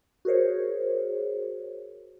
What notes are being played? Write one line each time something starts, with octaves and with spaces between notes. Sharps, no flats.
F#4 G#4 A#4 C5 C#5